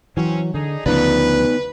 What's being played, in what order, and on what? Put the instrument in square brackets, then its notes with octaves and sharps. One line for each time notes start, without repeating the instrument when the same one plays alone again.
[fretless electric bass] E3 F#3 [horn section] C4 C#4
[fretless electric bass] D3 [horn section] D4 D#4 G#4
[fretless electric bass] D2 C#3 F3 [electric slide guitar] B3 D#4 D5 [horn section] B4